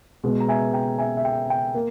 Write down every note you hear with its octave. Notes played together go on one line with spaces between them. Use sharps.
B2 G#3 B3
A#5
E5 G#5
G5 A#5
E5 G#5
E5
G5
G5
A#3